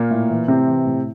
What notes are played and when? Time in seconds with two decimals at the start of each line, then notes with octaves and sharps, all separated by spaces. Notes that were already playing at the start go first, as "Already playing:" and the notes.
Already playing: A#2 A#3
0.11 A2
0.30 E3
0.48 A2 C3 C4
0.67 E3
0.86 A2